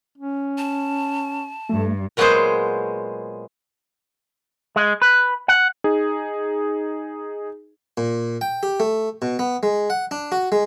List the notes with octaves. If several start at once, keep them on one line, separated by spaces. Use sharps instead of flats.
C#4
A5
G2 A3
A#2 F#3 G#3 B3 G#4 C5
G#3
B4
F#5
D#4 G#4
A#2
G5
G4
A3
B2
B3
G#3
F#5
D4
F#4
G#3